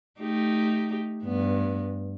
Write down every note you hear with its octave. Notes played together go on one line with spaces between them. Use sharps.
A3 D#4 G4
G2 B3